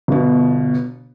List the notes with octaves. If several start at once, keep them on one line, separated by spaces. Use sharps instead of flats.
G1 B2